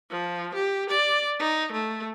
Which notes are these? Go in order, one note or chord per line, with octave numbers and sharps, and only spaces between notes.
F3
G4
D5
D#4
A3